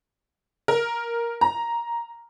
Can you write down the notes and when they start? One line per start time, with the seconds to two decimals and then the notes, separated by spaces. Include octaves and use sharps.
0.68 A#4
1.41 A#5